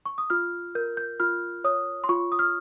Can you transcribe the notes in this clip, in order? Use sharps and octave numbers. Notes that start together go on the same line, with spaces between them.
C#6
D#6
F4 F6
A#4 G6
G6
F4 F6
C#5 D#6
C6
F4 C#6
D#6
F6